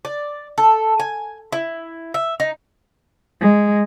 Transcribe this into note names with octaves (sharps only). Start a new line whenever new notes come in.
D5
A4
G#5
E4
E5
D#4
G#3